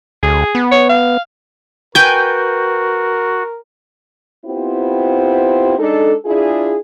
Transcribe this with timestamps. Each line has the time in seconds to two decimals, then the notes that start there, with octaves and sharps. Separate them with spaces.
0.23 D2 G#4
0.55 B3
0.72 C#5
0.89 F5
1.95 F#4 A#4 B4 G5 G#5 G6
4.46 B3 C4 E4 F4 G4 C5
5.79 G#3 D4 D#4 A4
6.25 D4 E4 F4 G#4